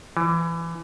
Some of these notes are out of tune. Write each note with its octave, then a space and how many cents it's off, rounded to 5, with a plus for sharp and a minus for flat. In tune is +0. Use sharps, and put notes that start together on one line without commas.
E3 +25